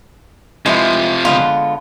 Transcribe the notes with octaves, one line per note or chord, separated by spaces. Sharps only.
C3 E3 F3 G#3 F4 E5
D3 G#3 B3 F4